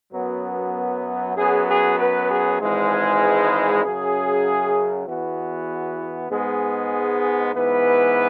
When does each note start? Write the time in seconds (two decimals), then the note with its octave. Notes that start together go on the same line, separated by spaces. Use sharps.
0.13 F#2 F#3 B3
1.37 F#2 F#3 B3 G#4
1.68 G#4
1.99 B4
2.29 G#4
2.60 G#1 G#2 E3 G#3
2.91 G#4
3.22 B4
3.83 F#2 C#3 F#3 G#4
5.07 E2 E3 B3 F#4
6.31 G#2 G#3 B3 G#4
7.53 G#2 E3 B3 B4